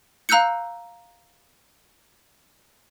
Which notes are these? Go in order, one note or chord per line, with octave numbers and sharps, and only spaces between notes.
F5 A#5 E6 F#6 G6 C#7